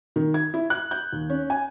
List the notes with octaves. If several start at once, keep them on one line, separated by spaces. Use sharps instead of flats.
D#3
G#6
E4
F#6
G6
D#2
C#4
G#5